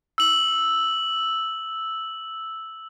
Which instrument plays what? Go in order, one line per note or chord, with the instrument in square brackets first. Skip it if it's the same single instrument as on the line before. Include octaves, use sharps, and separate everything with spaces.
[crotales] E6 F#7